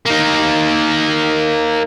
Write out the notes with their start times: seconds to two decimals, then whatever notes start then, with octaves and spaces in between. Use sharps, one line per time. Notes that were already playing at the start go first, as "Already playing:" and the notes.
0.06 A#3 D#4